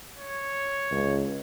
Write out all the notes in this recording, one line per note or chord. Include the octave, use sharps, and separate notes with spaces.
C#5
C#2